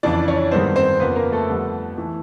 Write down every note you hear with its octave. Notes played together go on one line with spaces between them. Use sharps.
F2 C#3 E3 D4 D5
C#4 C#5
G2 D#3 G#3 B3 C4 C5
C4 C5
F2 C#3 F3 A#3 B3 B4
A#3 A#4
A3 A4
F2 D3 G3 B3
E3 A3